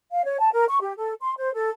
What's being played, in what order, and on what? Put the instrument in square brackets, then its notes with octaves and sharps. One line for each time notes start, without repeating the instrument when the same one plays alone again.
[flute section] F5
C#5
A5
A#4
C#6
G4
A4
C6
C5
A4